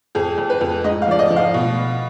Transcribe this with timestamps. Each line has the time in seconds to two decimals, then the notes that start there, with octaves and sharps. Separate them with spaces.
0.15 F2 G#4
0.38 F2
0.50 B4
0.61 F2
0.84 G#2 D#5
1.02 F5
1.07 F3 D5
1.19 D#5
1.30 F3
1.36 F5
1.54 B2